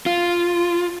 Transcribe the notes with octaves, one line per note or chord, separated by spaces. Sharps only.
F4